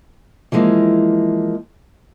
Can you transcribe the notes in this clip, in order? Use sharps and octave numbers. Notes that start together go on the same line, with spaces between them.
E3 F3 G#3 A#3